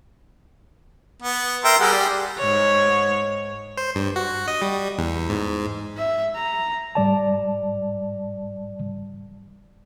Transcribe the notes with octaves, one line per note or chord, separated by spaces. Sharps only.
B3
A#4 E5 G5 A#5 C6 E6
G3 G#4 A#4 F#5
G4 D5
G#2 C#5
C5
G2
F#4
D#5
G3
E2
G#2
E5
A#5
G#2 G3 D5 A5